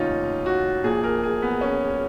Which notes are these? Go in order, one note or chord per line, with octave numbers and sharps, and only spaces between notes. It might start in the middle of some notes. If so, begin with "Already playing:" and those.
Already playing: F1 D#2 D#3 C#4 D#4 F4
F#4
A#1 A#2 G#4
A#4
G#4
B3
C#4